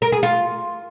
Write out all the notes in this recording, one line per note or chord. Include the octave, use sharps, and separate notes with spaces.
A#4
G#4
F4